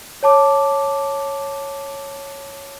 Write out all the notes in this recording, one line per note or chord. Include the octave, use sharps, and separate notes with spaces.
C#5 A5 D6